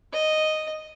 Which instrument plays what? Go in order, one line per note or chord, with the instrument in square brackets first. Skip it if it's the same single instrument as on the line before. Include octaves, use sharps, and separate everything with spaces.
[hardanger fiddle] D#5